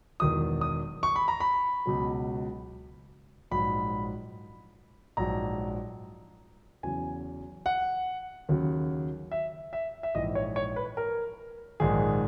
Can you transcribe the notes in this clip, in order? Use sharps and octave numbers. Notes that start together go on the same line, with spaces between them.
E1 E2 D#3 F#3 D#6
D#6
C#6
B5
A#5
B5
C#2 B2 F#3
A#1 G#2 F#3 B5
A#1 G#2 F#3 A#5
E2 C#3 F#3 G#5
F#5
D#2 C#3 F#3
E5
E5
E5
A#1 G#2 E3 D#5
C#5
C#5
B4
A#4
A#1 G#2 D#3 G#4